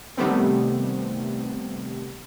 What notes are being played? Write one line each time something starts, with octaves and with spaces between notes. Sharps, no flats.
C3 D#3 G3 A3 B3 C4